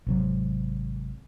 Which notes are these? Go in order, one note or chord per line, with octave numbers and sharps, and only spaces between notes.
G#1 C3 F#3